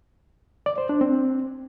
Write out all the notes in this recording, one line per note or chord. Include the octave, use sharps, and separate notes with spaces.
D5
C5
D4
C4